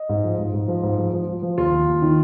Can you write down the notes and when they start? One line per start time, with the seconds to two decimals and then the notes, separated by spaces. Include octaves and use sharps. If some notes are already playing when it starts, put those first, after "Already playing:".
Already playing: D#5
0.09 G#2
0.24 F3
0.39 G#2
0.54 G#2
0.68 F3
0.83 G#2
0.98 F3
1.13 F3
1.27 F3
1.42 F3
1.58 D#2 F4
1.72 D#2
1.87 D#2
2.02 D#3